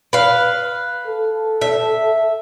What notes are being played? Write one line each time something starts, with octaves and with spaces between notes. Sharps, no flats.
B4 F5
A4
E5